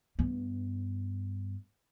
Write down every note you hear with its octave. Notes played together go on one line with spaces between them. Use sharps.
G2 B3